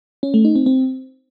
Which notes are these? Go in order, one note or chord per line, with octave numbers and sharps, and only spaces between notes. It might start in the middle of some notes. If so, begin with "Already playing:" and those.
C#4
A3
D#4
C4
C4